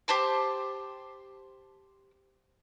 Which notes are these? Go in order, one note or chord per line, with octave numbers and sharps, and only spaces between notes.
G4 C5 A5 C6